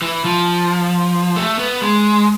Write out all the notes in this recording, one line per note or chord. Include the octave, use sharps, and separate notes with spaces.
E3
F3
A3
B3
G#3